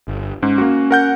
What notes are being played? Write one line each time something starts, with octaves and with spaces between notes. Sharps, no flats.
G1
G#2 C#4
A#3 F#4
A#4 F#5 G6